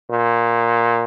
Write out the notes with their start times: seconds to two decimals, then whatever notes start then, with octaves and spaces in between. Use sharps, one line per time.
0.11 A#2